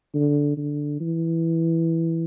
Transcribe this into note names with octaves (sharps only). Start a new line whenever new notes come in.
D3
D3
E3